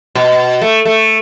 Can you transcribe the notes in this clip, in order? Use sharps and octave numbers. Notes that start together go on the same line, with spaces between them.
B2
A3
A3